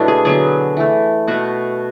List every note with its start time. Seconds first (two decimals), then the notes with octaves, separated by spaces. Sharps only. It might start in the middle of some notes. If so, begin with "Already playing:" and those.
Already playing: B2 F#3 A3 B3 D4 E4
0.08 G#4
0.25 D3 F#3 B3 G#4
0.77 E3 A3
1.28 B2 A3 F#4